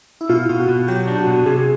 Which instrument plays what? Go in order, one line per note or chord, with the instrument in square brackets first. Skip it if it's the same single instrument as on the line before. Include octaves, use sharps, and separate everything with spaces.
[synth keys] E4
[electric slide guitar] B2 [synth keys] F4
[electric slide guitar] B2 [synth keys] F4
[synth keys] F#4
[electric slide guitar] B2
[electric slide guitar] F#3 [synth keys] G4
[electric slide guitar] D4
[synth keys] F#4
[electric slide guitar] B2
[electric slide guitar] C3 [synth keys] G#4